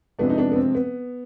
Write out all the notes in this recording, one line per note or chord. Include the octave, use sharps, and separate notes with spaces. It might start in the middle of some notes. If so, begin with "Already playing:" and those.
F2 C3 F3 G#3 B3 D4
D#4
B3 D4
B3
C4
B3